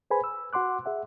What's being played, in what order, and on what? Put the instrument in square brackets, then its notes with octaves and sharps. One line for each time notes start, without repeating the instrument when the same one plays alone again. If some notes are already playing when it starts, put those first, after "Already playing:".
[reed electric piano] G#4 B4 C5 G#5 B5
E6
F#4 F#5 C6 D6 F#6
G#4 E5 F#5